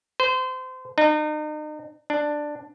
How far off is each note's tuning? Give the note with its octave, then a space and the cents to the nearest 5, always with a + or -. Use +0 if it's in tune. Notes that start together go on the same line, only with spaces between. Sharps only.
C5 -30
D#4 -40
D4 +10